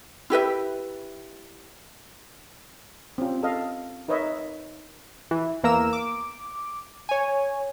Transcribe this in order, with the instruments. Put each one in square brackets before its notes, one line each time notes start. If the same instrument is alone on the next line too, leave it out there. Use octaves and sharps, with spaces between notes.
[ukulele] E4 G4 B4 E5
[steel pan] C4 C#4 F4
A4 D#5 F5
D#4 A#4 B4 C#5 D#5 E5
[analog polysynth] E3
E2 A#3 A#4 A#5 E6 E7
D6
C#5 G#5